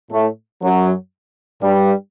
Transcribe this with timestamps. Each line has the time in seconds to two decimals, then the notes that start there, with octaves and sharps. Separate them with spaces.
0.11 A2 A3
0.61 F#2 F#3
1.61 G2 G3